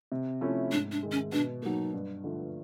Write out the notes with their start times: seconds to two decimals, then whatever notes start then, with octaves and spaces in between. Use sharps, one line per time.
0.12 C3
0.41 F3 A3 C#4 E4
0.71 G#2 D4
0.92 D4
1.03 D#3 G#3
1.12 C#4
1.32 B2 D4
1.62 F#3 A#3 D#4
1.94 G2
2.24 D3 F3 A3